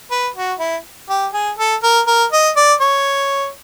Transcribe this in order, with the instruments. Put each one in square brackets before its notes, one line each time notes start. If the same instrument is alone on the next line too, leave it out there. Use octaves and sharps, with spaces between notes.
[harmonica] B4
F#4
E4
G4
G#4
A4
A#4
A#4
D#5
D5
C#5